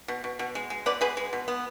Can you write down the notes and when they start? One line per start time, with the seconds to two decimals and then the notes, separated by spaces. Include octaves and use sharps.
0.08 B2
0.24 B2
0.39 B2
0.55 G#3
0.70 G#3
0.86 B2 B4 D5
1.01 B2 G#4 B4
1.17 G#3
1.33 B2
1.48 B3